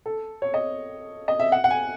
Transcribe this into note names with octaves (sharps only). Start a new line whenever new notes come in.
A4
C#5
D#5
D#5
E5
F#5
F#5
G#5